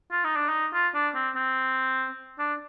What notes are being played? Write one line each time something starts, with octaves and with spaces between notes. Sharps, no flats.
F4
D#4
D4
D#4
F4
D4
C4
C4
D4